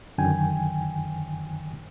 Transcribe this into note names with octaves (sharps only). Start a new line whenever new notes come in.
F#2 D3 D#3 G5 G#5